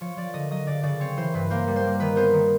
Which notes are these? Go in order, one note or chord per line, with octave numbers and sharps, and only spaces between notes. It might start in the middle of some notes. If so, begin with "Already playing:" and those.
F3 C#5
F3 D5
D3 D#5
F#3 D#5
C#3 D5
C#3 D5
C4 C#5
E3 C5
G2 B4
A#3 C5
G3
C5
A#3
D#3 B4
B3 C5
D#3